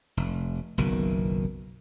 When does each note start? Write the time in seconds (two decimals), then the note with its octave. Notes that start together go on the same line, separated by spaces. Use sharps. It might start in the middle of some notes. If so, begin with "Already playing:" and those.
0.17 F1
0.78 F#1 B1 B2 D#3